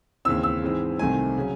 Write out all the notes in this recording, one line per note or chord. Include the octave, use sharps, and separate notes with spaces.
D#2 C#3 E3 C4 E6
E6
G#2 E3 G#3 C4
C2 C3 D#3 A3 C4 G#5
C#3 F#3